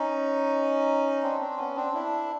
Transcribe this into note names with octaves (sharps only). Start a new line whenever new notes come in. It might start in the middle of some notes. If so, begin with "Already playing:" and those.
Already playing: C#4 D#4
C4 D4
C4 D4
B3 C#4
C4 D4
D4 E4